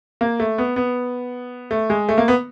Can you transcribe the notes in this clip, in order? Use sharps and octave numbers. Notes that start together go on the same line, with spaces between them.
A#3
A3
B3
B3
A3
G#3
A3
A#3
B3